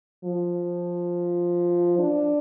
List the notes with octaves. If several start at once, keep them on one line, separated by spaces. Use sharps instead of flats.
F3
D4